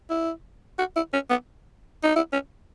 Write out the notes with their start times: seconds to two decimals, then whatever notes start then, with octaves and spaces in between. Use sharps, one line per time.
0.10 E4
0.78 F#4
0.96 E4
1.13 C#4
1.30 B3
2.03 D#4
2.16 E4
2.32 C#4